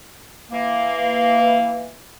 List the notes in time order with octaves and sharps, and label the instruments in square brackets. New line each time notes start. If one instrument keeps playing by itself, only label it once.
[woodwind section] E3 A#3